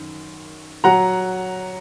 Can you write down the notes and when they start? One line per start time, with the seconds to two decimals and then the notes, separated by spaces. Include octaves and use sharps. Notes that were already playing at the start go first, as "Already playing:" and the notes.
Already playing: F#2 D#3
0.84 F#3 F#5 A#5